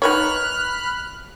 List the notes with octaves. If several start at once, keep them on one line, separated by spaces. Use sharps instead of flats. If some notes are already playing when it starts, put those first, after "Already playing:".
D#4 B4 C#5 B5 F6 F#6